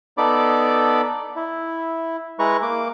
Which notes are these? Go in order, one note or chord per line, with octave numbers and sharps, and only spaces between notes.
B3 D#4 A4 D5 B5 D6
E4
G#3 E4 B4 A#5 C#6
A#3 D6